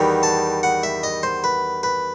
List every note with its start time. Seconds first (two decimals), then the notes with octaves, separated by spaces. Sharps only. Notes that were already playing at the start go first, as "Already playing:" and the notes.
Already playing: E2 D#3 G3 B3
0.23 A5
0.63 F#5
0.83 E5
1.03 D#5
1.23 C5
1.44 B4
1.83 B4